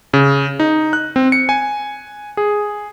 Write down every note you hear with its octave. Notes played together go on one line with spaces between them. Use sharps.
C#3
D#4
F#6
C4
C#7
G#5
G#4